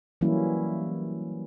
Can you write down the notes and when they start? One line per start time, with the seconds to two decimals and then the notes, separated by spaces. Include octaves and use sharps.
0.21 E3 F#3 G3 A#3 C#4 E4